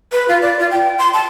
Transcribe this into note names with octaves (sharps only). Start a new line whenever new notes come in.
B4
F4
D5
F4
G5
C6
A5